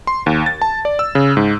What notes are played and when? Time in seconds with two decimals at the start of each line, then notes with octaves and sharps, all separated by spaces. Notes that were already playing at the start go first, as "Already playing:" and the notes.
0.07 C6
0.26 D#2
0.46 A6
0.62 A5
0.85 D5
0.99 E6
1.15 C#3
1.37 G#2